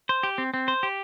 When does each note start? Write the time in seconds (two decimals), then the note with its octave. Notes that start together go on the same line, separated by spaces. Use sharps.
0.09 C5
0.23 G4
0.38 C4
0.54 C4
0.68 C5
0.83 G4